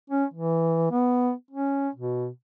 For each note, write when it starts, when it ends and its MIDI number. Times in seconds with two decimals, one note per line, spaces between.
0.10 0.25 61
0.34 0.90 52
0.91 1.32 59
1.51 1.89 61
1.95 2.28 47